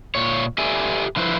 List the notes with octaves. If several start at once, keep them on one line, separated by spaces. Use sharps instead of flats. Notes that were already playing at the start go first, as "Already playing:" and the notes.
A#2 C#5
G4 A4 B4 D5 E5 G#5
D3 F3 E4 B4 C5